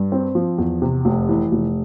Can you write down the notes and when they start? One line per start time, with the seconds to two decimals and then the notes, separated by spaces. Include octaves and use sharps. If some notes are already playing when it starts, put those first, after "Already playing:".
Already playing: G2
0.12 C4
0.35 F3
0.58 E2
0.82 C3
1.05 F1
1.29 E3
1.52 F1